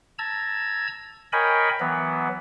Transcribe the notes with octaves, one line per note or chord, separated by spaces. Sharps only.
A5 A#5 E6 G#6
A#4 C#5 D#5 G5 G#5 B5
E3 F#3 B3